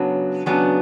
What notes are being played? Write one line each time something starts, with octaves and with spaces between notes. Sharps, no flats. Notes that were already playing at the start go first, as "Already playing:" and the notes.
Already playing: C#3 F#3 B3 D4
C#3 F#3 B3 D4